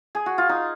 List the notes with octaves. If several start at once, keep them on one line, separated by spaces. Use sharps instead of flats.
G#4
F#4
F4
D#4